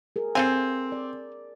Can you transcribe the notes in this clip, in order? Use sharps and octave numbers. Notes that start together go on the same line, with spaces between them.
G#4 A#4
C4 A4 F5 G#5
D5